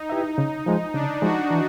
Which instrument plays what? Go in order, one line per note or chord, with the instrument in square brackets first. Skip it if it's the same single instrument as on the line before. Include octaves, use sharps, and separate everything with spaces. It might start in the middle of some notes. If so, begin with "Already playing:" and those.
Already playing: [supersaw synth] D#4
[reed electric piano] E4 G4 B4 E5
C#3
F3 G#3
[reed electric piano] C#3 [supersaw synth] D4
[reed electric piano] F3 G#3 [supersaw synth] F#4
[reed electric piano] E3